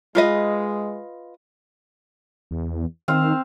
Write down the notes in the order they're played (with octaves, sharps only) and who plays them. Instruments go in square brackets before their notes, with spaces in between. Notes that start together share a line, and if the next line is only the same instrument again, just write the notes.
[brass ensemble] G#3 [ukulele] F4 B4 D#5
[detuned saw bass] E2
[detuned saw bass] D#3 [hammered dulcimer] C4 F5